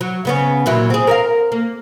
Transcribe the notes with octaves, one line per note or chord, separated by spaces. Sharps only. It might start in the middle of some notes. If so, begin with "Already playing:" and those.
F#3
C#3 B3 C#4
A#2 F#3 E4
C4 G#4
A#4 E5 F5
A#3